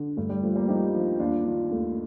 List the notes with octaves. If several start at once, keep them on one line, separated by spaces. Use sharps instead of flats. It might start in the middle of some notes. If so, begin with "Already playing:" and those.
Already playing: D3
G2 A3
G3
F3 A3
G3 A#3
F3 D#4 G4
F3
D#2 D4 F4
D#3 D4 F4
D#2 A3